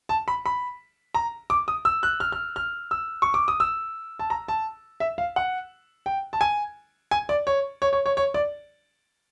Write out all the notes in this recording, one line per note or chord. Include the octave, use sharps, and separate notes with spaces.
A5
B5
B5
A#5
D6
D#6
E6
F#6
F6
F6
F6
E6
C#6
D6
D#6
E6
A5
A#5
A5
E5
F5
F#5
G5
A5
G#5
G#5
D5
C#5
C#5
C#5
C#5
C#5
D5